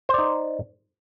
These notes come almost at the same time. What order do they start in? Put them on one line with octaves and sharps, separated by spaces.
C5 D5 D#4